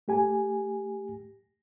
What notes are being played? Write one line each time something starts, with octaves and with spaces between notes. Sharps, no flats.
A3 G4 G#5